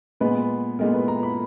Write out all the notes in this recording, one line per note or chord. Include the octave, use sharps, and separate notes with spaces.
A#2 G#3 B3 B4
A#2 G#3 B3 A#4
B4
A#5
B5